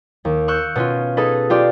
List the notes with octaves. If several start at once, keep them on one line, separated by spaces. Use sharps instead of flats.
D#2
C#6 E6 F#6 G6
B2 C#4 F4
D#4 G#4 A4 B4
F4 G4 D5